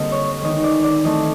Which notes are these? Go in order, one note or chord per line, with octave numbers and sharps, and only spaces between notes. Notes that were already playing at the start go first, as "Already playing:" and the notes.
Already playing: D3 G3 A#3 C4 D#5
C#5
D#3 G#3 B3 D#5
D5
D5
E3 A3 C4 D#5